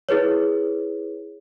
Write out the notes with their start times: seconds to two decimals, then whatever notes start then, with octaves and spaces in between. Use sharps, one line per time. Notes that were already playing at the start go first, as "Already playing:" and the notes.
0.09 E4 G#4 B4 C#5